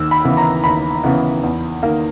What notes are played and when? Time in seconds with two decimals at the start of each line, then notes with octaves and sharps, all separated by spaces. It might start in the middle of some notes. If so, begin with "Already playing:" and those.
Already playing: D#2 E6
0.11 B5
0.25 C#3 E3 B3
0.37 A#5
0.64 D#2 B5
1.04 C#3 E3 B3
1.43 E2
1.83 D#3 A#3